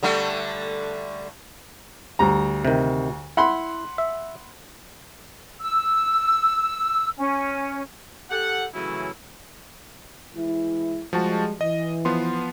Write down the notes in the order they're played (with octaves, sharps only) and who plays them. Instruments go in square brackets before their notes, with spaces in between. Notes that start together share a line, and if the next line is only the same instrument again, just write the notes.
[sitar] D3 G3 A3
[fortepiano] D2 G3 A#5
[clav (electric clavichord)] C3 D#3
[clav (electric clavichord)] E4 [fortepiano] F#5 B5 C6
[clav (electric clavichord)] E5
[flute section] E6
C#4
[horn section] G4 A4 F#5
C#3 E3 F#3 A3 C#4 E4
[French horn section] E3 G#3 E4
[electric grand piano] F3 F#4 A5 [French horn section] G3 G#3
[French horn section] E3 [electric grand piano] D#5
[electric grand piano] F3 B3 C6